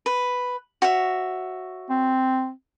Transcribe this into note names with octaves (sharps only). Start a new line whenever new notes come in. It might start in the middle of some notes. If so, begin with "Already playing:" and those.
B4
F#4 C#5 E5
C4